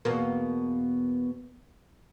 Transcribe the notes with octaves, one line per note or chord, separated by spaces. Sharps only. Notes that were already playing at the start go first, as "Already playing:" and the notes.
E2 B2 A#3